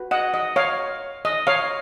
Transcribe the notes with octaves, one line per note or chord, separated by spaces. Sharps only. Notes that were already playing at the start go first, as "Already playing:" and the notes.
Already playing: F#4 B4
D#5 F#5
D#5
C#5 F5
D#5
C#5 F5